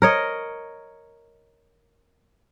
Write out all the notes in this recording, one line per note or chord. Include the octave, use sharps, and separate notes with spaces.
A#4 C#5 D#5